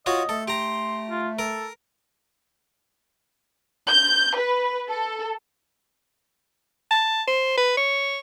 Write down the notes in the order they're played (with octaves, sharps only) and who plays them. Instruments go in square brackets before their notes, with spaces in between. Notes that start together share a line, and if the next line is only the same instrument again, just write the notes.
[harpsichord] F4 F#4 C#5 [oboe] D#5
[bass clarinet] A3 [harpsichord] A4
[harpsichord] G4 A#5 [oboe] C6
[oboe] F4
[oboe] A4 [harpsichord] A#4
[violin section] G6
B4
A4
[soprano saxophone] A5
C5
B4
C#5